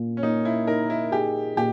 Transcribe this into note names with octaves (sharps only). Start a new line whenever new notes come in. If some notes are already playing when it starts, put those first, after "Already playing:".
Already playing: A#2
C#4
A#3 D#4
E4
D#4 A#4
E4
G4 G#4
A#2 G4